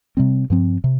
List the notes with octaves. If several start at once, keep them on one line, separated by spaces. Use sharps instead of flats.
C3 G3 C4
G2 F3 C4
C3